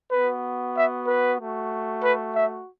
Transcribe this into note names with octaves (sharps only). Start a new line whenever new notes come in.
B3 F#4 B4
E5
B4
A3 F#4
B4
E5